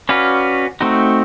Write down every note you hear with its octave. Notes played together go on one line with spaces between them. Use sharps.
C#4 F#4 B4 D5 F5
A3 C4 D#4 F#4